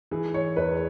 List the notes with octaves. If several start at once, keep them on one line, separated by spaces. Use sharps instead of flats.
E3 G#4
C#5
E2 B4